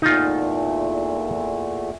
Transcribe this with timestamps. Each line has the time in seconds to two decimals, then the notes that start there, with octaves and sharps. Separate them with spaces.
0.02 E2 A#2 A3 D#4 F4